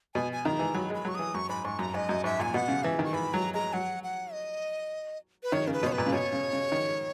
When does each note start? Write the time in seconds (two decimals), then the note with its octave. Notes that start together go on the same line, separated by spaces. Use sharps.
0.15 B2 G#5
0.33 G#5
0.45 D#3 A#5
0.59 E3
0.74 F#3 B5
0.90 G#3 B5
1.05 F#3 C#6
1.15 E3 D#6
1.34 F#2 C#6
1.49 G#2 B5
1.65 G#2 C#6
1.79 F#2 A#5
1.94 G#2 D#5
2.09 F#2
2.24 G#2 E5
2.39 A#2 G#5
2.54 B2 F#5
2.68 C#3
2.84 E3 E5
2.99 D#3
3.04 C#6
3.13 E3 B5
3.33 F#3 A#5
3.54 G#3 A#5
3.73 F#3 F#5
4.04 F#5
4.33 D#5
5.43 B4
5.52 D#3 C#5
5.67 C#3 A#4
5.73 B4
5.83 B2 C#5
5.92 B4
5.98 A#2
6.06 C#3
6.12 B2 C#5
6.33 C#3
6.53 C#3
6.72 D#3